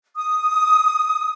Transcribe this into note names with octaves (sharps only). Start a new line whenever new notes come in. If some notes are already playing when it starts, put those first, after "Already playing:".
D#6